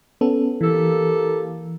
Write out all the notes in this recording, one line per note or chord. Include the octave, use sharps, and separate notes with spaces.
B3 C#4 A4
E3 A#3 G4 A4